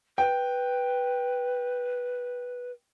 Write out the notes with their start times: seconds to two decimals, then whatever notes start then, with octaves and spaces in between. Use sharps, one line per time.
0.18 B4 G5